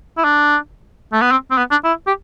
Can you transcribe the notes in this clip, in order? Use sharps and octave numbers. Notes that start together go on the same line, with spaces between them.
E4
D4
A3
B3
C4
C4
B3
D4
E4
G4